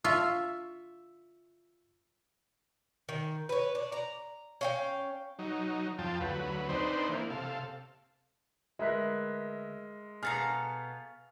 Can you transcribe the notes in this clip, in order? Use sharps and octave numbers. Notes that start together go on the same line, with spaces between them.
F4 E5 C#6 E6
D#3
B4 C#5
D4
A#5
C#4 F5 G5
F#3 D#4
F2 F4 G5 A5
D2 F#3 B4
C4 D4 D#4 B4 C5
E3 A#3
C3 A4 F5
D2 G#3 A#4 B4 E5
B2 B3 G#4 A4 F5 A#5 F6